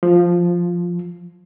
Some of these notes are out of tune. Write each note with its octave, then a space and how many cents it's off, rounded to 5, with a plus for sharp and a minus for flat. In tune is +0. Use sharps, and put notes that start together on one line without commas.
F3 +0